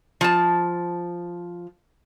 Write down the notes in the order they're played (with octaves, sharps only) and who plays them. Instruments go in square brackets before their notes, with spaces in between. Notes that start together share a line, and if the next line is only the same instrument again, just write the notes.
[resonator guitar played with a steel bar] F3 A5